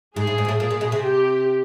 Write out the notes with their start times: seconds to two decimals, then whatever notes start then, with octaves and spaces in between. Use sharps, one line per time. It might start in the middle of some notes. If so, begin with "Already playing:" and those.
0.16 G#2 G#4
0.27 A2
0.38 G#2
0.45 A#2
0.49 A2
0.59 A#2 G#4
0.71 A#2
0.81 B2
0.92 C3
1.03 G4